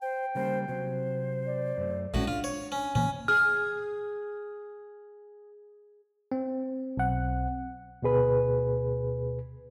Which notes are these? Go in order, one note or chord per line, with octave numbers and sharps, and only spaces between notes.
C5 G5
C#3 G3 A#3 C5
C3 F#3 C5
D5
F#2 A3
A#1 A2 G#3 C#4 F#4
D4 F4
C#5
C#4
A#2 E3 A#3 C#4
G#4 F6
C4
B1 F#5
D2 B2 G#4 B4